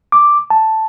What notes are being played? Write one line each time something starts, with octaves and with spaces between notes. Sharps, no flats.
D6
A5